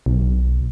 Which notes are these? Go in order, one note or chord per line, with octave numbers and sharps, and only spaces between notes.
B1